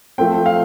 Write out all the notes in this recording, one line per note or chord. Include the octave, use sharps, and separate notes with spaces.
F3 A3 C4 G5
G5
F5